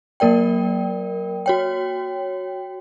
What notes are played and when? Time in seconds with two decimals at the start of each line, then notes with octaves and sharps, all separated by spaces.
0.20 F#3 A#3 A#4 D5 G5
1.46 F#4 C#5 G5